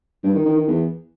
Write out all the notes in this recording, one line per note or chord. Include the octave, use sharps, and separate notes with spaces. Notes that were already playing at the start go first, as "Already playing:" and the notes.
G2
D#3
D#3
D#3
E2